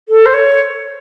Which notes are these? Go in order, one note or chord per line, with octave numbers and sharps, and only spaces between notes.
A4
C5
C#5